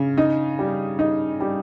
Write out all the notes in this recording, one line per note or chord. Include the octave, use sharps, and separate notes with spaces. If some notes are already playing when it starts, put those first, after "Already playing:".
Already playing: C#3
D#4
G3
D#4
G3